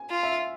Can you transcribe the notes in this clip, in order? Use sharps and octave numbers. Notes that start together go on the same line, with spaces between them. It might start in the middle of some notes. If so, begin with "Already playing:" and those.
Already playing: G#5
F4
E5
F5